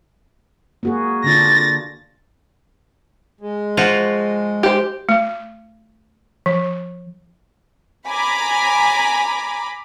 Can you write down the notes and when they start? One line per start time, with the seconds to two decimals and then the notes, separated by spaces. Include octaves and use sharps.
0.83 A#3 F#4 G#4
1.24 D3 D4 F4 A6 A#6
3.41 G#3
3.77 F3 F4 F#4
4.63 G4 C5
5.09 A3
6.46 F3
8.06 G#5 A#5 B5 D6